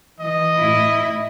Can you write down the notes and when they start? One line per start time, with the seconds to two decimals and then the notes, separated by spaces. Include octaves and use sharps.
0.20 E3 D#5
0.60 A2 E4